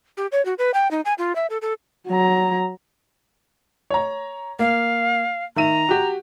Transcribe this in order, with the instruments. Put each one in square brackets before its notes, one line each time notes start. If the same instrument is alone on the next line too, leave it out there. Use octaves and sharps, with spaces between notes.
[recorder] G4
C#5
F#4
B4
G5
D#4
G#5
F4
E5
A4
A4
[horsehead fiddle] F#3 A#5
[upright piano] C#5 A#5
[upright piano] A#3 [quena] F5
[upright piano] D#3 E5 D#7 [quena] A#5
[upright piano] F#4 G4